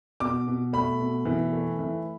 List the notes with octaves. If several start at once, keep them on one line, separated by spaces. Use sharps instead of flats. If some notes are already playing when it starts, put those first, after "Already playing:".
B2 D6
B2
A3 B5
B2
E3
A3
E3